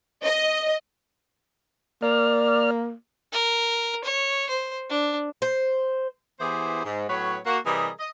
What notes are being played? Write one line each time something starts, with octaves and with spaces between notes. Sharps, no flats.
D#5
A#3 D5 F6
A#4
C#5
C5
D4
C5
E3 B3 E4 G4 G#4 C5
G#2
A2 F#3 B3 B4 C#5
A#3 F#4
C3 E3 G3 G#4 A#4 D#5
D#5